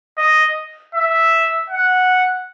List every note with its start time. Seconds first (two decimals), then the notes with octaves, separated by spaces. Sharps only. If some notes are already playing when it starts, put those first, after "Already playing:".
0.18 D#5
0.95 E5
1.70 F#5